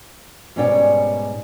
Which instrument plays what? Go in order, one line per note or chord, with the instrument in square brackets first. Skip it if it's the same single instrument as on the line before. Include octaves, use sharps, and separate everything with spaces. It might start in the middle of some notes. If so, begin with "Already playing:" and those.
[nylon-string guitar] G#2 B2 G3 C#4 D5 G5